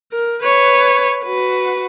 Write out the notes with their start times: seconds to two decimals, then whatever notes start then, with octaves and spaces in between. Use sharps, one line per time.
0.12 A#4
0.42 B4 C#5
1.23 F#4 B4